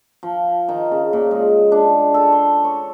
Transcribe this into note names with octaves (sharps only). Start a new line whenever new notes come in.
F3
D#3
C#3
A#2
G#3
D4
A4
C6
C#5